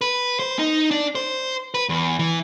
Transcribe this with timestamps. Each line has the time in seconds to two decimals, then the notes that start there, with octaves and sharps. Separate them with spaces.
0.01 B4
0.39 C5
0.59 D#4
0.91 D4
1.15 C5
1.74 B4
1.89 E2
2.19 E3